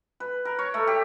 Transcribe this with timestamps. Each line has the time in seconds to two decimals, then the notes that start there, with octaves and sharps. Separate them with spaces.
0.20 B4
0.45 A#4
0.59 C#5
0.74 A3
0.87 G4